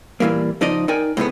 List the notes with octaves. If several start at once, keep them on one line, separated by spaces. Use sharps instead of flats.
A#2 C#3 E3 G3 A#3
C#2 F3 D#4 D5 D#5
D#4 A#4 D5 G5 G#5
A2 C3 G#3 B3